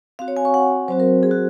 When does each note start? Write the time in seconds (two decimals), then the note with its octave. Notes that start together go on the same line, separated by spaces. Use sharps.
0.19 C4 F#4 F5
0.28 C#5
0.37 G#5
0.45 C#6
0.54 F#5
0.88 F#3 C4 F#4 C5
1.00 A#4
1.23 G#4
1.31 F#4